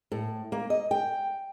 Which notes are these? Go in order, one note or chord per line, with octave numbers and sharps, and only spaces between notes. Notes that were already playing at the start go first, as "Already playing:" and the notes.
A2
A#3
D#5
G5